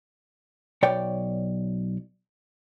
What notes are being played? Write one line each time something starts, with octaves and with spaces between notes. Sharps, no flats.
B1 C#5 D5 G5